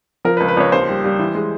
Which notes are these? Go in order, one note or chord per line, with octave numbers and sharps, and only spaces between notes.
F3 A#4
B4
C#2
B4
C#2 C#5
D#2 C5
G3
G3
E3
G#3